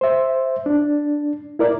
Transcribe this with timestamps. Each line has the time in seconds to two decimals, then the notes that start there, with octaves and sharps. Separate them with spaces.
0.01 C5 E5
0.66 D4
1.59 E4 A#4 D5